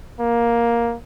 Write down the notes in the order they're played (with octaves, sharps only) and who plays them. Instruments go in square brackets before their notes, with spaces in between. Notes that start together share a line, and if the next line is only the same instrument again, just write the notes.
[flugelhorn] A#3